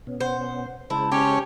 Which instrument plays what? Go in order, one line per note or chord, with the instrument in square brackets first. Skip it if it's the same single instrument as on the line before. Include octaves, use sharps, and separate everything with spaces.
[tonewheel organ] B2 B3 C#4
[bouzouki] C5 [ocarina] F#5
[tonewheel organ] C#3 G#3 C5 [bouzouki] E4 [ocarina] A5
[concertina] C#4 C#5 [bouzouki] G4